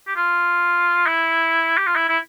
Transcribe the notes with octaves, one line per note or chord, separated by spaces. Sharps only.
G4
F4
E4
G4
F4
E4
E4